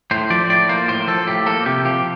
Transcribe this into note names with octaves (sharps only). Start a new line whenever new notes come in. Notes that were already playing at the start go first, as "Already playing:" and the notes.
A2 C5
F3 D5
A2 D5
A#3 C5
A2 C5
F3 A4
A2 G4
A#3 A4
C3 G4
F3 G4